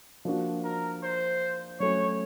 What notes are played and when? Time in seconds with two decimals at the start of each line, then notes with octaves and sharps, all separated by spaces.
0.25 F3 A#3 D4 F#4
0.64 A#4
1.03 C5
1.80 F#3 A3 C#4 C#5